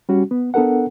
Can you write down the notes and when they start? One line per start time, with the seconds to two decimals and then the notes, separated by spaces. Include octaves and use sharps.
0.09 G3 C#4 F#4
0.31 B3
0.54 B3 D4 A4 A#4 F#5